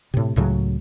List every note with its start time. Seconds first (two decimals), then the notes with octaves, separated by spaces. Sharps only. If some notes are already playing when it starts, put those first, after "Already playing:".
0.14 A2 C3
0.36 C#2 A2 C#3 F#3